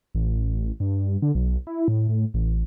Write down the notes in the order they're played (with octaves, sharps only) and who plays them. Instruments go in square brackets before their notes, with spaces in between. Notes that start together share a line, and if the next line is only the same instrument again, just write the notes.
[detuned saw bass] A1
G2
D3
B1
E4
A2
A2
A1